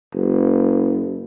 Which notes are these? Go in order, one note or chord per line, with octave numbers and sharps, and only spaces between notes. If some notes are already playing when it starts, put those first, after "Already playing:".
F#1